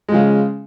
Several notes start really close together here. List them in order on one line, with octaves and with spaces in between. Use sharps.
G#3 F3 C#3